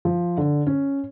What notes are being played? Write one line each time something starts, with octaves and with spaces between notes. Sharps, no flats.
F3
D3
C#4